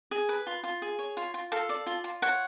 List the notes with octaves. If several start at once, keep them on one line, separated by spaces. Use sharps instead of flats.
G#4
B4
F4
F4
G#4
C#5
F4
F4
A4 F5
D5
F4
F4
C#5 F#5